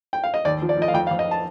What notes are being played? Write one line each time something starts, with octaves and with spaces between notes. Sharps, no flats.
G5
F5
D#5
D#2 D5
F3
D5
F3 D#5
F5
F2 G5
F5
F2
D#5
A5